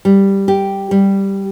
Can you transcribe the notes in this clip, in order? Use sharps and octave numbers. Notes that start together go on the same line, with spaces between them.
G3
G4
G3